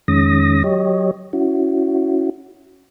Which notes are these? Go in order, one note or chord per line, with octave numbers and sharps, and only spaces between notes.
F2 D#3 G#3 C#4 D#6 A#6
F#3 G4 C#5 D#5
C#4 E4 F#4